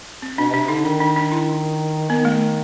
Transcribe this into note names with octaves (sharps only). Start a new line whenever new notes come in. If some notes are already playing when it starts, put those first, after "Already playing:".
C4
B2 D4
C3 D4
D3 D#4
D#3 D4
D4
D4
E4
D#3 B3
A3